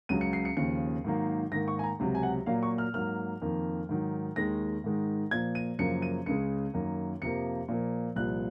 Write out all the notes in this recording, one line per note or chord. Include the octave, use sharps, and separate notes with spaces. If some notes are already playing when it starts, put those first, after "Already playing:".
C#2 C#3 F#3 D#7
C#7
C7
C#7
D#2 C#3 F3 C#7
G#2 D#3 F#3 A#3
G#2 D#3 A#3 A#6
C#6
G#5
A#5
C#2 C3 F#3
G#5
F#5
A#2 F#3 A#3 F5
C#6
F6
G#2 F#3 A#3 F6
F2 D#3 A#3
G#2 D#3 F#3
D#2 D#3 G#3 A#6
G#2 D#3 G#3
A#2 F3 A#3 G#6
D#7
F#2 C#3 F3 A#3 C#7
D#7
C#2 C#3 G#3 C#7
F#2 D#3 A#3
F2 C3 F3 A#3 C#7
A#2 F3 A#3
C2 A#2 F3 F#6